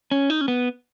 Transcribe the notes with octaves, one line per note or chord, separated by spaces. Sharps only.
C#4
D#4
C#4
B3